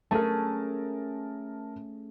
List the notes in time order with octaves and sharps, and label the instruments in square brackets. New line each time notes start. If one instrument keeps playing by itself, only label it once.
[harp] A3 C#4 G#4 [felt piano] A#4 A5